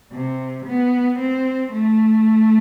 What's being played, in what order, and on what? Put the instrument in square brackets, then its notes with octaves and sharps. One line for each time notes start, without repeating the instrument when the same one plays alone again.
[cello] C3
B3
C4
A3